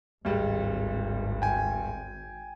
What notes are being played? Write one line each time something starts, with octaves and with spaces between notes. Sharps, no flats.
D1 G#1 G3 G#3
G5 G#5